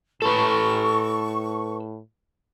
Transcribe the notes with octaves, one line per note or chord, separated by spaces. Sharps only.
A2 A4 B4 C#6